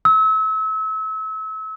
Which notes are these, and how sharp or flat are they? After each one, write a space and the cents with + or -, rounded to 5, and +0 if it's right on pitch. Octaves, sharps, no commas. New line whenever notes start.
E6 -35